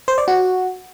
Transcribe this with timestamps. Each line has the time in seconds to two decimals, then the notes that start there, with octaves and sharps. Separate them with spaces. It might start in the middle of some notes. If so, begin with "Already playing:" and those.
0.08 C5
0.18 D5
0.28 F#4